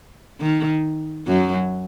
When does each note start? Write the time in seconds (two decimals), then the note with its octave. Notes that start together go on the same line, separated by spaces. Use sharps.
0.41 D#3
1.27 F#2 F#3